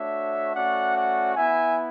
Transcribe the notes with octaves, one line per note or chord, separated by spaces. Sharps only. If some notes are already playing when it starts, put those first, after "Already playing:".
Already playing: A3 D4 F#4 C#5 E5
A3 C#4 F#4 D5 F#5
D5 F#5
B3 E4 E5 G#5